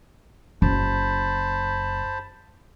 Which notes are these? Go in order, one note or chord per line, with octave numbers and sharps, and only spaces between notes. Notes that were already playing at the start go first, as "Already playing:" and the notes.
F#1 C5 A5 B5